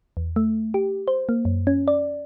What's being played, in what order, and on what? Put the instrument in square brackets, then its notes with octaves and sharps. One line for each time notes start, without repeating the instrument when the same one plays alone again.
[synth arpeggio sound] E2
A3
G4
C5
A#3
F#2
C#4
D5